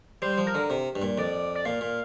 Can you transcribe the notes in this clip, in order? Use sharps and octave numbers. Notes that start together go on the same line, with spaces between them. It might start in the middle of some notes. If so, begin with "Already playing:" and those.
G3 C5
F3
A#4
D3
C3
G2
A#2
F2 D5
D5
A#2 F5
A#2